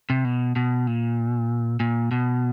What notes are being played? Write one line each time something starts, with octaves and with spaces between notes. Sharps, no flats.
C3
B2
B2
A#2
A#2
B2